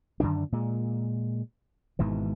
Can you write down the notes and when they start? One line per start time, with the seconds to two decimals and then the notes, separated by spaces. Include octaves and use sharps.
0.20 F#2 D3 D#3 D4
0.52 A#2 G#3
1.99 G#1 G#2 B2 E3